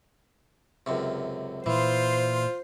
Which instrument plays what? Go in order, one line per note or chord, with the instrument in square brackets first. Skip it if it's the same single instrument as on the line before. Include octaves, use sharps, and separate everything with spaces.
[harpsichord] C#2 F#2 C3
[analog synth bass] A#2 [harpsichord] E3 [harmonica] F4 [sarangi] C5